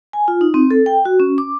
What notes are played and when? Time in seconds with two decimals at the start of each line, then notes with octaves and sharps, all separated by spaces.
0.13 G#5
0.28 F4
0.41 D#4
0.54 C4
0.71 A4
0.86 G5
1.05 F#4
1.20 C#4
1.38 D6